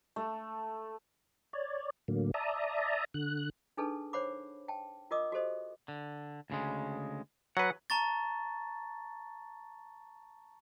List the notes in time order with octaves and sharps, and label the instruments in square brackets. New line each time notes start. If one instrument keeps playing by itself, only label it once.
[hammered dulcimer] A3
[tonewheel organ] C#5 D5
A2 D3 F#3 A#3
D5 E5 A5 A#5 D#6
D3 F#6
[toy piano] D4 D#4 G#4 A4 B4 A5
C5 C#5 F#5 B5 D6
G5 A5
F4 A#4 D#5 D6 D#6
F#4 G4 A4 C5 D#5
[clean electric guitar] D3
D2 C#3 G#3
[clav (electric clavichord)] F#3 B4 [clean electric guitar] F#5
[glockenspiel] A5 A#5 C#6 A6